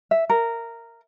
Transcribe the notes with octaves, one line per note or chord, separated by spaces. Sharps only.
E5
A#4